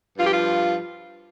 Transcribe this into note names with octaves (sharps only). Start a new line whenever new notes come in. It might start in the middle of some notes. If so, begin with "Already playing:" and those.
G2 F3 F4
G4
F4